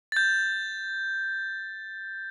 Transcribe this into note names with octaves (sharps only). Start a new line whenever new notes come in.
G6 A6